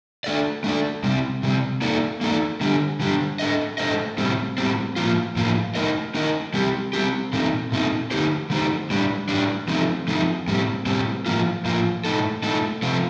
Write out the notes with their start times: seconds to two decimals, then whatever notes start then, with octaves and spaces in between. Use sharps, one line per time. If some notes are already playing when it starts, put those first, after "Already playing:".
0.24 A3 D4 A4 D5
0.64 A3 D4 A4 D5
1.04 C3 G3 C4
1.43 C3 G3 C4
1.82 A#3 D#4 A4 D5
2.21 A#3 D#4 A4 D5
2.61 D3 G3 D4 G4
3.00 D3 G3 D4 G4
3.39 A3 D4 A4 C5 D#5
3.78 A3 D4 A4 C5 D#5
4.18 A2 G3 C4
4.58 A2 G3 C4
4.96 A2 F3 A#3 F4
5.36 A2 F3 A#3 F4
5.75 A3 D#4 A#4 D#5
6.15 A3 D#4 A#4 D#5
6.54 G3 C4 G4
6.93 G3 C4 G4
7.33 A#2 A3 C4 D#4
7.72 A#2 A3 C4 D#4
8.11 D3 A3 D#4 G4 C5
8.50 D3 A3 D#4 G4 C5
8.90 A2 G3 D4
9.29 A2 G3 D4
9.68 F3 A3 C4 D#4
10.08 F3 A3 C4 D#4
10.48 A2 G3 C4
10.86 A2 G3 C4
11.26 A2 F3 A#3 F4
11.65 A2 F3 A#3 F4
12.05 A2 A3 D#4 A4
12.43 A2 A3 D#4 A4
12.83 C3 F3 A3 C4 F4